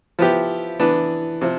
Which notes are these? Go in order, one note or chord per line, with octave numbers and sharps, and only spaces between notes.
F3 B3 E4 G4
E3 B3 D4
C3 F3